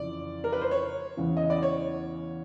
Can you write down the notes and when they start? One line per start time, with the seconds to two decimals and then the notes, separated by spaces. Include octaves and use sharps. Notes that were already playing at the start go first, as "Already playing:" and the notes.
Already playing: F2 C#3 E3 D5
0.44 A#4
0.53 B4
0.61 C5
0.71 C#5
1.17 E2 C#3 E3
1.37 D#5
1.50 D5
1.63 C#5